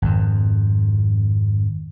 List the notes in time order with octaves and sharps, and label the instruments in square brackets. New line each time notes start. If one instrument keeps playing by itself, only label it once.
[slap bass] G#1 F2